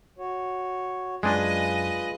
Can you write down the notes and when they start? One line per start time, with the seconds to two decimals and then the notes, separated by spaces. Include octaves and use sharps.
0.18 F#4 C#5
1.23 F#2 G#3 D4 F4 G#4 B4 D#5